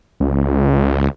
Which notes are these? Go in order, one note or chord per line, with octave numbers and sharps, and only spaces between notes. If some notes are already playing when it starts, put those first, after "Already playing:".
C#2